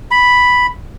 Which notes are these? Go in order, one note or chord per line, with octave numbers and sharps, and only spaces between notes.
B5